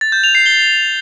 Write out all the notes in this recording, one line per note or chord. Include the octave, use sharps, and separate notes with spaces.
A6
G6
F7
C7
G7